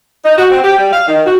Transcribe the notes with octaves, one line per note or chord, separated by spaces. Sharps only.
D#4
F#4
C4
G4
G3
F5
D#3
F#4